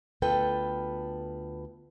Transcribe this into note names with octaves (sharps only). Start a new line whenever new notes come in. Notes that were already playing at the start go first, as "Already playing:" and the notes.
D2 B3 F4 A4 B4 G5